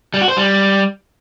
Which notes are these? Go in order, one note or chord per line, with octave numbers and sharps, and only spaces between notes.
G3
F#4
C5
G3